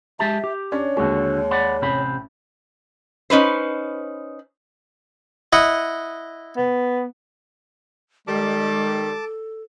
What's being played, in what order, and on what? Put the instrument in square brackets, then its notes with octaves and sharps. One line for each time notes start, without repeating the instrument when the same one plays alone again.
[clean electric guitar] G#3 G4 A5 [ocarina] E5
[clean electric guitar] G4
[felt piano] C#4 D4 [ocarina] C#5
[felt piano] D#2 G#3 [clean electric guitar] D3 F#4
[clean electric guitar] D5 F#5 B5
[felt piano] A1 [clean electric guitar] C3 C4 B5
[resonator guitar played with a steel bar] C#4 D#4 B4 C5
[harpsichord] E4 D#5 F#5
[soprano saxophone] B3
[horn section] D#3 G3 [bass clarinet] G#3 [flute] A4 [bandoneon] A5 D6